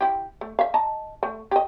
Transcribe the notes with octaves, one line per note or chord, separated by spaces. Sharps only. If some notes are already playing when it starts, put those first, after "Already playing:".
E4 G4
A3
E5 F5
D#5 A5 A#5
A3
G4 D#5